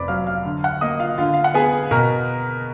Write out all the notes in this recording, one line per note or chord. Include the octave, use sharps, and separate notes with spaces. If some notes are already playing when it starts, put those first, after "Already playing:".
Already playing: F1 F2 B4 D5 B5 D6
F#3 F5 F6
F5 F6
D3
F#5 F#6
A#3 D#5 D#6
F4 F5
D3 F4 F5
F5
F#5
B3 G#4 G#5
B2 A#4 A#5